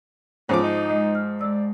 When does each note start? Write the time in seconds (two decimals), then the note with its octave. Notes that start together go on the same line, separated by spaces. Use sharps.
0.49 G#2 F3 C#4 D6
0.63 D#4
0.90 G#3 D#5
1.15 F6
1.41 G#3 D5 E6